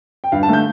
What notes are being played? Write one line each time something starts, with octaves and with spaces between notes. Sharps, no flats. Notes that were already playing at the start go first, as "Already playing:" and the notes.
G5
G2 F5
A5
D3 A3 G6